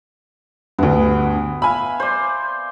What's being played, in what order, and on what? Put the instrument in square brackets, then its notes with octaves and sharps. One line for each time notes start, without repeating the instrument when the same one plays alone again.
[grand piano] D2 G2 [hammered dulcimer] B3
[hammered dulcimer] E5 F5 [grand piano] G#5 B5
[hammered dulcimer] C5 D5